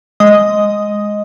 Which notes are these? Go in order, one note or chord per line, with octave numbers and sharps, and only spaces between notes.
G#3 D#5 D#6